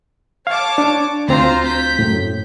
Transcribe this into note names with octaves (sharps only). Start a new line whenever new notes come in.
C#5 F5 A5 D6
D4
D2 C4 F4 C5 A#5
G6 B6
F#2 A2